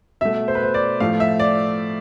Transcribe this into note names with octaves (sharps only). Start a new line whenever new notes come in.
B2 A3 E5
C5
B4
C5
D5
A2 F3 A3 F5
E5
D5